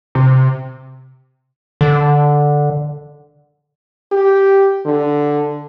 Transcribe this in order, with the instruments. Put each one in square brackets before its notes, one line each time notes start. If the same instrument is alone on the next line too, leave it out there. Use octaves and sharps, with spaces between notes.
[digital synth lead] C3
[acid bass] D3
[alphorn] G4
D3